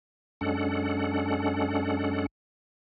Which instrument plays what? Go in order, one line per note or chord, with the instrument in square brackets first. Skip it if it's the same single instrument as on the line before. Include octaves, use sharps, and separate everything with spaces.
[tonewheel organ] F#2 G#3 C#4 D4 A4 F#5